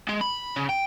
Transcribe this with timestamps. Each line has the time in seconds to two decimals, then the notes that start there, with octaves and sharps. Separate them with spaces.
0.09 G#3
0.21 B5
0.56 C#3
0.69 G5